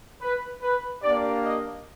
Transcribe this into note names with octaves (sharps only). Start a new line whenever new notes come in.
B4
B4
A#3 D4 G4 D5
D#5